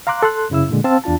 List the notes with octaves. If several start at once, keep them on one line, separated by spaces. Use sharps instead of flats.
F5 A#5 C6 D6 F#6
A4 C6 F#6
F#2 C#3 E4 E6
A#2 D3 G#3
C4 F5 A5 E6
E2 D4 F4 A5